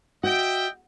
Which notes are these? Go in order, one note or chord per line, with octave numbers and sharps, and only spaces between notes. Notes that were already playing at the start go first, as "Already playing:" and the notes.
F#4 D#5 E5 G5